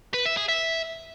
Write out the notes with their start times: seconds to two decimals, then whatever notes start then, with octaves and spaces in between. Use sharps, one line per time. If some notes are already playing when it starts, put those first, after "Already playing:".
0.14 B4
0.25 E5
0.37 G#4
0.49 E5